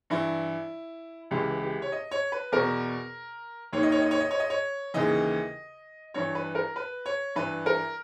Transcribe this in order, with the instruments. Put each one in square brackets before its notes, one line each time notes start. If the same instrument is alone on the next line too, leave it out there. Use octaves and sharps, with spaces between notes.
[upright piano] G2 E3 E4
C#2 C#3 E3 G4
G4
C#5
D#5
C#5
B4
E2 B2 A#4
D#2 C#5
D#3
D#5
C#5
D#5
C#5
D#5
C#5
D#5
C#5
D#2 C#3 E3 D#5
G2 E3 C#5
B4
A#4
B4
C#5
G2 E3 B4
A#4